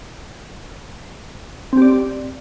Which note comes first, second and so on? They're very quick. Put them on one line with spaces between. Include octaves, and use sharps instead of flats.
C4 G4 D5